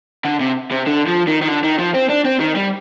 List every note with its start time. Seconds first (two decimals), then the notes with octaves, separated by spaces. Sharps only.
0.25 D3
0.40 C3
0.71 C3
0.87 D3
1.07 F3
1.27 D#3
1.42 D#3
1.48 D3
1.64 D#3
1.79 F3
1.94 C4
2.09 D4
2.25 C4
2.40 D#3
2.56 G3